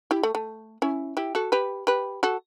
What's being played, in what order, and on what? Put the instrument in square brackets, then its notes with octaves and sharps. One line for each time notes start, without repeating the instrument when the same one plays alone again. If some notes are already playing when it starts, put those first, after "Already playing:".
[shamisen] E4 G4
A3
A3
C#4 E4
E4 G4
F#4 A4
G4 B4
G4 B4
F#4 A4